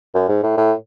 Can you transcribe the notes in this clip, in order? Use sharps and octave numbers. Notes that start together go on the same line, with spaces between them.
F#2
G#2
A2
A2